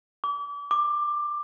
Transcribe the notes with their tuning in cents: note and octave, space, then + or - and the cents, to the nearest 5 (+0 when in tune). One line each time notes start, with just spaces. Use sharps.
D6 -35
D6 +15